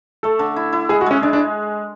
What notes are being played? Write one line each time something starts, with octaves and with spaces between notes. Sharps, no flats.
A3 A4
D3
E4
E4
G#3 G#4
F#4
G#3 C#4
G#3 D4
D4